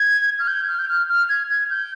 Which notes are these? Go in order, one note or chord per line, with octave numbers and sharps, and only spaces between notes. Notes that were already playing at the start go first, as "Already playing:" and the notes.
Already playing: G#6
F6
G6
F6
G6
F6
F6
G#6
G#6
G6